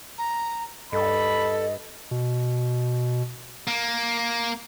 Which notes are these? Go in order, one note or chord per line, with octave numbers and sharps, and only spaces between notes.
A#5
G2 A4 D#5 B5
B2
A#3